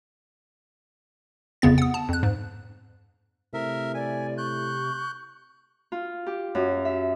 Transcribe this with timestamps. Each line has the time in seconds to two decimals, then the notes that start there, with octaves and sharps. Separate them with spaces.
1.62 G1 F2 C#3 B3 A6
1.78 F#5 D#6
1.94 A5
2.09 F2 F#6
2.23 G#2
3.53 A2 C3 A#4 E5
3.94 D5 G#5
4.38 C#6 F#6 G6
5.92 F4
6.26 G4
6.55 F#2
6.85 E5